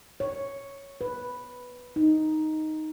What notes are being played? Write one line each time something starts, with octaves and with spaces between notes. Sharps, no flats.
C#5
B4
D#4